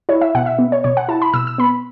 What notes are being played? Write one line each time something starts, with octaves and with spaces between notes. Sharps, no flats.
E4 C#5
E5
B2 F#5
E5
B3
C#5
B2 C#5
F#5
E4 A5
B5
B2 E6
E6
B3 B5